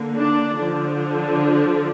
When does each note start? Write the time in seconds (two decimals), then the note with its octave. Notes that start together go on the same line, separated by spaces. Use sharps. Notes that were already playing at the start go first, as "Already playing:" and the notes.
Already playing: D3 A#3
0.14 D4
0.58 D3 F3 D4